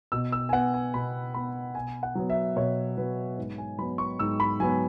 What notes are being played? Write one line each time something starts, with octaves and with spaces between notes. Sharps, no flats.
B2 E6
E6
G#5
B3 F#5
G#5
B2 B5
B3 B5
B2 G#5
F#5
F#3 B3
E5
B2 C#5
F#3 B3 B4
G#2 B4
G#5
F#3 B3 B5
C#6
G#2 E6
B5
F#3 B3 G#5